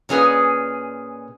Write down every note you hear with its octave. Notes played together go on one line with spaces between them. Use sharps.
A#2 C#4 G#4 B4 D#5